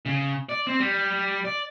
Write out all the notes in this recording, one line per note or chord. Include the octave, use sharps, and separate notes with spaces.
C#3
D5
C4
G3
D5